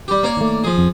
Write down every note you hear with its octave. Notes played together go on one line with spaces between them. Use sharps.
G3 G4
A#3 C#5 D5
D#3 A3
F3 G#4
F2